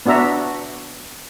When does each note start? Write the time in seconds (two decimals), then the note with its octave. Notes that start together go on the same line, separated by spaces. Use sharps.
0.06 B3 D4 F#4 E5 A#5